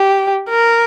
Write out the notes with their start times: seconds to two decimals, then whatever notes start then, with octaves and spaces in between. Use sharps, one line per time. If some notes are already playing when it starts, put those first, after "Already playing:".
Already playing: G4
0.49 A#4